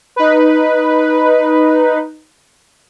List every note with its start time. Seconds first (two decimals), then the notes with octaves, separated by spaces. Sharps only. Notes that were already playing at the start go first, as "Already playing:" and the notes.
0.16 D#4 B4